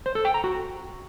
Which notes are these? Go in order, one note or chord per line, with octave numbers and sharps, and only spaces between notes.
C5
A4
G5
A#5
F#4